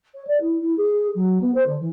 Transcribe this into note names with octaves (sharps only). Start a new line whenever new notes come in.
C#5
D5
E4
E4
G#4
F#3
B3
C5
D3
E3